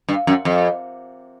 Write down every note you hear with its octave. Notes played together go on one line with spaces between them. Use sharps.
G2
F#2
F2